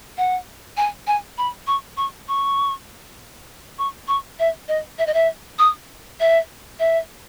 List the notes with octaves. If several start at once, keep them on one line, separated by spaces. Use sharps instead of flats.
F#5
G#5
G#5
B5
C#6
C#6
C#6
C#6
C#6
E5
D#5
E5
D#5
E5
D#6
E5
E5